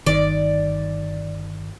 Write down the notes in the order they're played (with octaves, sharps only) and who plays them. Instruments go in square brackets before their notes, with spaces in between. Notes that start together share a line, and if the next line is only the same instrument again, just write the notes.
[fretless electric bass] G1 D#3 [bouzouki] D5